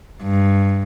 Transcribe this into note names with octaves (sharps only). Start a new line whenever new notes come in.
G2